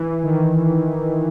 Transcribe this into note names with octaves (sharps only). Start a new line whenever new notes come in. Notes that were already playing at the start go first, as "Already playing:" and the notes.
Already playing: E3
D#3